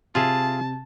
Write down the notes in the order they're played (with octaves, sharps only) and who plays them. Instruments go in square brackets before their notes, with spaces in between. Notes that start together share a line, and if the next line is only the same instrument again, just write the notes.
[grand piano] C3 [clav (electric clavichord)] F4 G#4 E5 [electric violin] A5